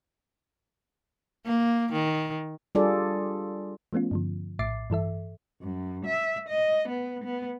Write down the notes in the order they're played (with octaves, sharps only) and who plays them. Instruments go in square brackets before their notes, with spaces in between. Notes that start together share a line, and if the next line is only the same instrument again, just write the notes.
[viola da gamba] A#3
D#3
[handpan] G3 D4 F4 G#4 A4 D5
[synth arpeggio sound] F3 A3 B3 C#4 F4
G2 D3 F3
A#1 A2 E5 D6 A6 C7
G2 E3 A4 E5
[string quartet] F#2
E5
D#5
B3
B3